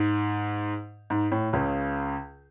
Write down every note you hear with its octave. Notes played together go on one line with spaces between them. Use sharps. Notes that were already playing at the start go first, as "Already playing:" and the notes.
Already playing: G#2
G#2
A2
C#2 C#3